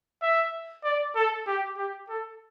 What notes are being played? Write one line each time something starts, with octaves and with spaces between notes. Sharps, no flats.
E5
D5
A4
G4
G4
A4